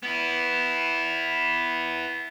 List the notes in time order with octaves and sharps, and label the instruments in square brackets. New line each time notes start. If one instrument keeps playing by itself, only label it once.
[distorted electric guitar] B3 E4